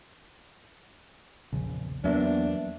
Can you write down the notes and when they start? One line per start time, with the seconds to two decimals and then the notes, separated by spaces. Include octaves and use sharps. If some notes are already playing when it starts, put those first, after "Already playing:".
1.53 A#1 E2 C#3
2.04 E2 F#3 A#3 B3 D4 E5